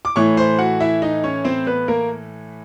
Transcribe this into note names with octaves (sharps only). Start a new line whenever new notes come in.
D6
A2 E3 A3 C#5 C#6
C5 C6
F#4 F#5
E4 E5
D#4 D#5
C#4 C#5
C4 C5
B3 B4
A#3 A#4